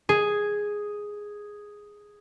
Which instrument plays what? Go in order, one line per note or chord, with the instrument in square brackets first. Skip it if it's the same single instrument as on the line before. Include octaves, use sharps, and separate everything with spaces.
[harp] G#4